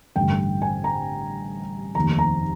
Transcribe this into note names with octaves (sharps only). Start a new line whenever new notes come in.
A1 G2 D3 G5
G#5
A#5
F1 D#2 D#3 A#5
A#5